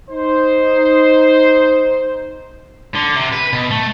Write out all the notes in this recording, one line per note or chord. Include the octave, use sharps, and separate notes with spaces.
D#4 C5
D3
C3
B4
B2
A3